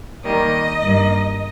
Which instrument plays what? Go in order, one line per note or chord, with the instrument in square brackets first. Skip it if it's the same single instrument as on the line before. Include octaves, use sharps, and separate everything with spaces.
[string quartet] D#3 G3 A#3 [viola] D#5
[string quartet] G2 D#3 A#3